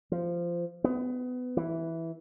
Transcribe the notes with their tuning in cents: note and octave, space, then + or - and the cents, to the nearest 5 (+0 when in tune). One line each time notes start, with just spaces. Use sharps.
F3 -15
B3 +25
E3 -5